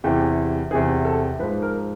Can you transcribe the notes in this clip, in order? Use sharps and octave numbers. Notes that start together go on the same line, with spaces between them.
E2 C3 E3 G4
E2 C3 E3 G#4
A4
G#2 F3 B4
A#4